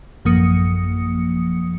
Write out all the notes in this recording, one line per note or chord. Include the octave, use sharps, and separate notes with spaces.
A1 F#2 F3 A#3 D#6 C#7